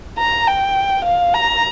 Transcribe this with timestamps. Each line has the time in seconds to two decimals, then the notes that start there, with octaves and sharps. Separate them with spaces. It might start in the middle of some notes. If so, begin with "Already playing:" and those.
0.18 A#5
0.47 G5
1.05 F5
1.34 A#5